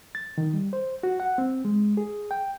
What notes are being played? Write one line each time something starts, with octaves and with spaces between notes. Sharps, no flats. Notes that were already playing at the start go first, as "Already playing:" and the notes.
A6
D#3
G3
C5
F#4
F#5
C4
G#3
G#4
G5